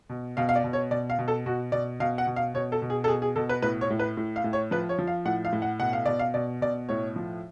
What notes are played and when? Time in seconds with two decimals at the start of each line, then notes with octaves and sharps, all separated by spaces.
0.09 B2
0.37 B2 F5
0.49 F5
0.56 D5
0.64 B2
0.73 C#5
0.91 B2 D5
1.10 F5
1.19 B2
1.28 A4
1.46 B2 F#4
1.72 B2 D5
2.00 B2 F5
2.18 F#5
2.27 B2
2.36 F5
2.54 B2 C#5
2.72 A4
2.82 B2
2.90 G#4
3.04 A4
3.08 B2 G#4
3.22 G#4
3.36 B2 A4
3.49 B4
3.62 A2 B4
3.81 C#5
3.90 A2
3.99 B4
4.17 A2
4.36 F5
4.44 A2
4.53 C#5
4.71 F3 B4
4.89 C#5
4.99 F3
5.07 F5
5.25 A2 F#5
5.45 F5
5.53 A2
5.62 F#5
5.80 B2 F#5
5.93 F5
6.06 B2 D5
6.19 F5
6.34 B2 D5
6.61 B2 D5
6.89 A2 C#5
7.16 F3